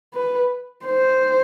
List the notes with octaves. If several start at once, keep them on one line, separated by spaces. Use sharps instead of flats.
B4
C5